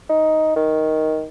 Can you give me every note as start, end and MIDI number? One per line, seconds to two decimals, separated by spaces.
0.10 0.56 63
0.56 1.25 51